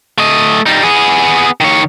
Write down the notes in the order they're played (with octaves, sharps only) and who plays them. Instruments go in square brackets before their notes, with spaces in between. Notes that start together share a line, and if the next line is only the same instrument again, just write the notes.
[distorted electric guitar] A3 D#5
G3 D#4
B3 G#4
D#3 C#5